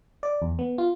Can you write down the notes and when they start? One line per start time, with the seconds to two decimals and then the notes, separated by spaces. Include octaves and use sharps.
0.23 D5
0.42 E2
0.59 B3
0.78 F4